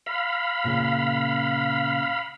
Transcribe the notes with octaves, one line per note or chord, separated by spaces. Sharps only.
F5 B5
A#2 C#3